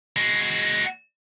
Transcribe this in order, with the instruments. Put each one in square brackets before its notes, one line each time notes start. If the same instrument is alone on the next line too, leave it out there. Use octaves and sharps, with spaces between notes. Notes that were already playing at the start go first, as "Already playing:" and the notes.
[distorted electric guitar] G#3 F#4